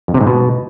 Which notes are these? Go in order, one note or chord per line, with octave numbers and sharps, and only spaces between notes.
F2
C3
G#2
B2